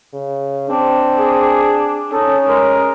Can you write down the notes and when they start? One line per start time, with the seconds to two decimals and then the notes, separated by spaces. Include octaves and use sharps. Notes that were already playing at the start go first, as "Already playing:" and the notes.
0.13 C#3
0.70 C4 D4
1.18 G#4
2.12 C#4 D#4 A4
2.49 G#3 A#4